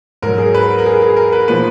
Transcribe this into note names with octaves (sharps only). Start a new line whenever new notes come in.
G#2 F#3 A#4
G#4
B4
A#4
G#4
G#4
A#4
B4
A#2 F3 B4